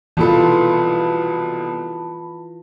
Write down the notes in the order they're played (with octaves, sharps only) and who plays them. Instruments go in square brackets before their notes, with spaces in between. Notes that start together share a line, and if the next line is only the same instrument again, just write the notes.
[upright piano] C2 B2 A4 [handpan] E3 F4 [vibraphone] A5 B5